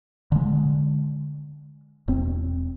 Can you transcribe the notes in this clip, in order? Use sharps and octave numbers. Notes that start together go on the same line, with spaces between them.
D3 G#3
E1 C4